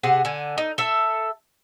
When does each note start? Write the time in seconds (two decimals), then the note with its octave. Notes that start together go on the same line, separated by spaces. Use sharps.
0.03 C3 G#4 F#5
0.25 D3 G#5
0.58 D#4
0.78 A4 E5